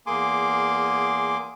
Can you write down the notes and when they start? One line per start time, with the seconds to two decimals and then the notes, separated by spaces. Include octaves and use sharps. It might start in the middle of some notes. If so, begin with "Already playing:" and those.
0.07 E2 A#3 G#4 G#5 C6 D6